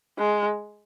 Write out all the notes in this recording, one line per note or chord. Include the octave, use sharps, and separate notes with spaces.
G#3